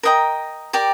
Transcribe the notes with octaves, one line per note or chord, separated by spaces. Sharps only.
A#4 D#5 G5 A#5
G4 A#4 D5 G5